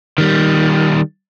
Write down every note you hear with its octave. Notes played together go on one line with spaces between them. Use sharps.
D#3 G3